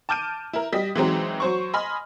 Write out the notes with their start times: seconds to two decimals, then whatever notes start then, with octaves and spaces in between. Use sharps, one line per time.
0.09 A5 D6 F6 G6 D7 D#7
0.53 E4 A#4
0.73 G3 D#5 B6
0.95 E3 F#3 G#3 C4 D#4
1.40 F#3 C5 C#6
1.74 D#5 G#5 B5 C6 F6